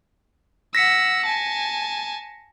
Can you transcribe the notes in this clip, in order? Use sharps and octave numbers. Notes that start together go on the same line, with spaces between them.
F#5 E6 A#6 B6 C#7
G#5 A5